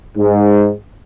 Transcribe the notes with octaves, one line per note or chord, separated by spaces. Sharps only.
G#2